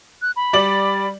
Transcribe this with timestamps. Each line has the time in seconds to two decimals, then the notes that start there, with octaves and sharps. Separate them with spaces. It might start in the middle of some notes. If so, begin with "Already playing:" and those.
0.22 F#6
0.36 B5
0.53 G3 D5 F#7